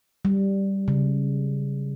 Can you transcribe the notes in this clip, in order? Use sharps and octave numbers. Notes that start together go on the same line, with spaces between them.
G3
C#3